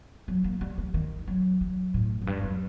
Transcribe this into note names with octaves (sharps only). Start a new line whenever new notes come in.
F#3
A#3
G3
G3
D#3
F#3
F#3
A2
F#2
G2
F#2